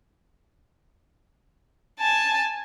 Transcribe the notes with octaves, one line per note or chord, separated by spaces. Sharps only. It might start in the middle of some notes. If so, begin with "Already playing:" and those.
G#5 A5